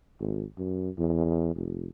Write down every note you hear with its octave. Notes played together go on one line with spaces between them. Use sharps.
G#1
F#2
E2
F1